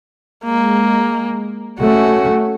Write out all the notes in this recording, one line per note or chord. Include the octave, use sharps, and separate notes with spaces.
G#3 A#3
A3 C#4 F#4